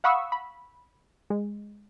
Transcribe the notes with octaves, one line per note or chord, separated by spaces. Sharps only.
F5 F#5 B5 C#6 D#6 E6
B5
G#3